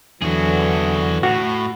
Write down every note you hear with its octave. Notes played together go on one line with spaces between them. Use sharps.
E2 D3 E3 F#3 F#4 G#4
A2 F#4